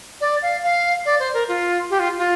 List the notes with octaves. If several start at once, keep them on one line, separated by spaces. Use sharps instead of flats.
D5
F5
F5
D5
C5
A#4
F4
G4
F4
F4